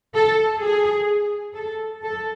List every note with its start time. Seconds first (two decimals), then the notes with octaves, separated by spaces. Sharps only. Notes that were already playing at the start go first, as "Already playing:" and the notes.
0.14 A4
0.61 G#4
1.55 A4
2.02 A4